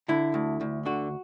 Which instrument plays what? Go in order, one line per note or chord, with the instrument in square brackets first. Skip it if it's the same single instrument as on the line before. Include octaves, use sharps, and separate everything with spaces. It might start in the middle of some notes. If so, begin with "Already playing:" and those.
[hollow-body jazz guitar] D3 E4
D2
D2
D3 F#4